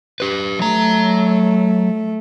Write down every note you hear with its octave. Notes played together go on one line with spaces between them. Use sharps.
G4 B4
F#3 A3 A#5